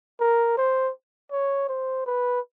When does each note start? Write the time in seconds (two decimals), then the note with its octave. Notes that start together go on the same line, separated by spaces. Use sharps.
0.20 A#4
0.57 C5
1.31 C#5
1.69 C5
2.06 B4